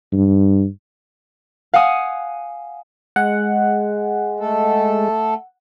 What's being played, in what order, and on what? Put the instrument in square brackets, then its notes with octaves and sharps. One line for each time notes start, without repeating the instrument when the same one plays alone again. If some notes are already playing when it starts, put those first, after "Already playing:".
[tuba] G2
[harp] F5 F#5 G#5 D#6
[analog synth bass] G#3 [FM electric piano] F#5
[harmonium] A3 A4